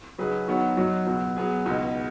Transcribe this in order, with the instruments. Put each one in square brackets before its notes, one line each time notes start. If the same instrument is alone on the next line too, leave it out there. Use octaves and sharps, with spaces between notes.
[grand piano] C#3 F#3 D#4 G#4 B4
D#3 F#3 B3 F#4 C#5
F#2 F#3 D#4 F#4
C#2 B2 F#3
F#3 B3 G#4
C#2 B2 G#3 D#4